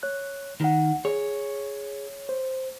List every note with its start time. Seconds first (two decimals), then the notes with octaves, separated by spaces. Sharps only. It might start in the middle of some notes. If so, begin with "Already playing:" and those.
0.03 C#5 F#6
0.61 C#2 D#3 F#5
1.05 G#4 C#5
2.29 C5